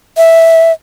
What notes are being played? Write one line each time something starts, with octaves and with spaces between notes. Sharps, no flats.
E5